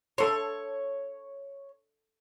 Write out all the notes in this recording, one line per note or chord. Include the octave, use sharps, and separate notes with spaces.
A4 C#5 C6